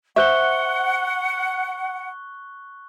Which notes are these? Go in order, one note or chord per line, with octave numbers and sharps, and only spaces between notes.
C5 E5 F#5 C#6 F#6 G7